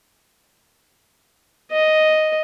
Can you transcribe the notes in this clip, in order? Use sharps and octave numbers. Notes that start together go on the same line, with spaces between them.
D#5